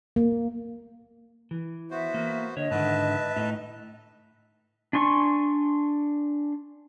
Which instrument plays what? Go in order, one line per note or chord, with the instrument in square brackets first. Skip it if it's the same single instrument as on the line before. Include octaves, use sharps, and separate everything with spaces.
[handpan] A#3
[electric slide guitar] E3
[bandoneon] B3 F#4 C5 [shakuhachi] E5
[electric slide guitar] A#3
[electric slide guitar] D3 C#5 [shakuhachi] D#5
[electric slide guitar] G#2 D3 D#3 [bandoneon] B4 E5 A5
[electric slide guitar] A2 D#4
[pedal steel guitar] D4 G#5 C6 C#6